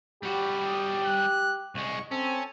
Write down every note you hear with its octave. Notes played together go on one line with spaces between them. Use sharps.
G3 F#4 G4 B5
D#6
F#6
C2 G#3 C#6
C4 C#4 A4